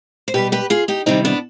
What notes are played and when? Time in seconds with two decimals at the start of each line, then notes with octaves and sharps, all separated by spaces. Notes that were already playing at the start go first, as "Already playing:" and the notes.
0.28 C5
0.34 B2 G3 G4 B4
0.52 G4 B4
0.70 F4 G#4
0.88 D#4 G4
1.06 C3 D#3 G3 C4 D#4
1.25 B3 D4